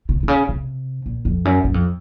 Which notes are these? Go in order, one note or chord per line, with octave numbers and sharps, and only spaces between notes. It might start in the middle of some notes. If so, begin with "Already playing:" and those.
C3
C3
C#3
C3
A#2
F2
F#2
F#2
F2